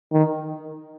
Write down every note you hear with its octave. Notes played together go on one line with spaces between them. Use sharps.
D#3